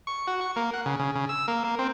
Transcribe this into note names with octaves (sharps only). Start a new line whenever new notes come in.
C#6
F#4
C#6
A#3
F#5
C#3
C#3
C#3
E6
A#3
A#3
C4